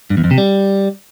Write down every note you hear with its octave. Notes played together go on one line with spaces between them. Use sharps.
G2
E2
F2
C3
G3